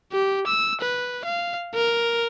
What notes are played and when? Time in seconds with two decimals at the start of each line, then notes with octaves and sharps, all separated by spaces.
0.12 G4
0.47 E6
0.81 B4
1.25 F5
1.75 A#4